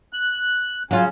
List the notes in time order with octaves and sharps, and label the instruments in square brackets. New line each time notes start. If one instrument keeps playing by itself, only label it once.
[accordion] F#6
[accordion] C#3 C#4 [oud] F#3 F4